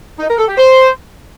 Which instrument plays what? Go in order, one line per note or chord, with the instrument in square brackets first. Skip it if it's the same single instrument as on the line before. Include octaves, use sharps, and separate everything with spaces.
[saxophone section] D#4
A#4
A4
G4
C5